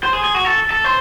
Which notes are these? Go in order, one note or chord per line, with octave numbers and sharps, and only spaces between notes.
C5
G#4
G#4
F#4
A4
A4
C5